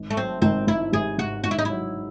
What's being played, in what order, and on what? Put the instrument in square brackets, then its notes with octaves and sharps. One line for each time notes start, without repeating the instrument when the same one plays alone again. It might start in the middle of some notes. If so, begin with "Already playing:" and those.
Already playing: [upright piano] G#1
[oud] A3
[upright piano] F#3 [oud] C4
[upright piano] G#1 [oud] C4
[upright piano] G#1 [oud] E4
[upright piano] G#1 [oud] G#4
[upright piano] G#2 [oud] F#4
[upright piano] G#1 [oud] F#4
[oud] E4
D#4
[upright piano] F#3 [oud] E4